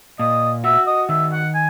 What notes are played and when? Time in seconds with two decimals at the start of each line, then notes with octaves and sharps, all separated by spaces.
0.19 A#2 D#5
0.64 F#4 E5
0.87 D#5
1.09 D#3 E5
1.32 F#5
1.54 G#5